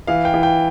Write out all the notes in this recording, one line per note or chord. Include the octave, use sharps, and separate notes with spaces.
E3 F5
G5
E3
G5